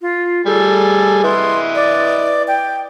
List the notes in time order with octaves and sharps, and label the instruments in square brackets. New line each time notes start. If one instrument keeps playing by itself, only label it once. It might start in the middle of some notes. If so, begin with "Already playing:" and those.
[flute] F4
[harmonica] G3 G#4 [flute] A4
[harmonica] E4 B4 D#5 [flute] C6
[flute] D5
G5